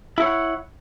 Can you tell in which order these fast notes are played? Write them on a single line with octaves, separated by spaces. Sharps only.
E4 C#5 F#5